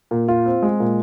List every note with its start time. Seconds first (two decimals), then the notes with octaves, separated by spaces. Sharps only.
0.11 A#2
0.28 F4
0.46 C4
0.62 G#3
0.80 A#2